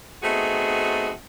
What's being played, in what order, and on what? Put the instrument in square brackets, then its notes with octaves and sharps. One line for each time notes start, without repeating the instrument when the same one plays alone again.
[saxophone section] A3 B3 C4 D#4 F#4 G#4